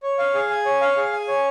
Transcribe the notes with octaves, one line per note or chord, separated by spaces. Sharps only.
C#5
F5
G#4
G#5
C#5
F5
G#4
G#5
C#5